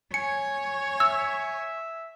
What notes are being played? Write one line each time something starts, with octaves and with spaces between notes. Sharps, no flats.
C#5 G#5 C#7
E5 E6